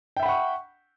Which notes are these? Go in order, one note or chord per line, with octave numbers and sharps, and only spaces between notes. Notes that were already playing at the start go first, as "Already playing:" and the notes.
E5 F#5 G5 B5 C#6